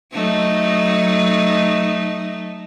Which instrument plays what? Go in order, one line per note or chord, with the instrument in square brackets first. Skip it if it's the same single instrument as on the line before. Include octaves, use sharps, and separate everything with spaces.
[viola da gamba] F#3 A3 D#4